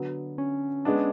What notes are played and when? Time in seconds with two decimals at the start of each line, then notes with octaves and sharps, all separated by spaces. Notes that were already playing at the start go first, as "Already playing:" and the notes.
Already playing: D3 F#3 B3
0.38 C#4
0.85 G#3 B3 D4